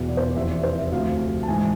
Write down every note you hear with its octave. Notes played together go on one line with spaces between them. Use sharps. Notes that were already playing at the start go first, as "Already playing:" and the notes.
Already playing: E2 B2
D5
C5
D5
F2 C3 E3 E5
D5
C5
E5
D2 C3 F3 F5
A5
G#2 E3 G#5